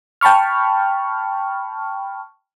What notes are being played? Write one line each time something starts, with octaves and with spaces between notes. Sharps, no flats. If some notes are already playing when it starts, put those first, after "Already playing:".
G5 A5 B5 C#6 F6